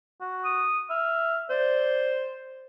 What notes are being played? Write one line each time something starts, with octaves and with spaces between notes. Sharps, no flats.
F#4
D#6
E5 F6
C5 D5